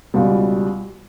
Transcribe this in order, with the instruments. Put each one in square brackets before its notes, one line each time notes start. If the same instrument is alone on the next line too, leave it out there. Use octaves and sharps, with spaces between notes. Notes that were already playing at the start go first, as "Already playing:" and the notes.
[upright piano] C#2 B2 G3